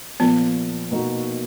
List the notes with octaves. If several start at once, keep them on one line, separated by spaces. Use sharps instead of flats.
A#2 F3 A#3 B3
B2 A#3 D#4 F#4